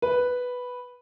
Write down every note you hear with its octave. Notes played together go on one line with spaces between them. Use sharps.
B4